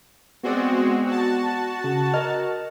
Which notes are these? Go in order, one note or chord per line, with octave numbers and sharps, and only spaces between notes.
G#3 B3 C4 F#4 D5
F#4 A5
C#3
A#4 D#5 A#5 F6